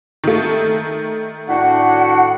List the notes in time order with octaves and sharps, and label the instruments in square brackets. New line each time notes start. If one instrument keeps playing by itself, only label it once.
[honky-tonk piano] D#3 A3
[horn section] A2 D4 F#4 [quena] F#5